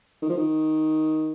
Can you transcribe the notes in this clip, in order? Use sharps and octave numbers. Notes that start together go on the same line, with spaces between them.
D#3
F3
D#3